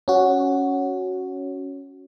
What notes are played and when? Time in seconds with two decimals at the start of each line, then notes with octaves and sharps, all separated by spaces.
0.08 C#4 F#4